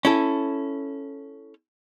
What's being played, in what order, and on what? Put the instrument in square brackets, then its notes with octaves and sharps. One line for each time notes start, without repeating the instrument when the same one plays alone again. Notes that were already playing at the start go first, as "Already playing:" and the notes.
[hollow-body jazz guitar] C#4 E4 A4